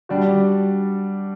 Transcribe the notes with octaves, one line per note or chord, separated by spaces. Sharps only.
G3 D4 F#4